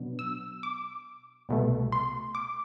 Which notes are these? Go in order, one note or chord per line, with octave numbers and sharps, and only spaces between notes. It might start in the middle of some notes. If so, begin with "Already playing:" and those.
Already playing: B2 F#3 B3 D4
E6
D6
C2 B2 A3
C6
D6